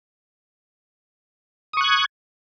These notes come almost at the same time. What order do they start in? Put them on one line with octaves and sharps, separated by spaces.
D#6 C#6 F#6 G#6